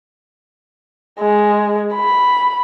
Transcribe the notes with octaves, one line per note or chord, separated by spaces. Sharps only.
G#3
B5